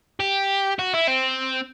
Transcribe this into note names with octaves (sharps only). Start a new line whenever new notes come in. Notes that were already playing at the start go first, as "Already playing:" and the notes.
G4
F#4
E4
C4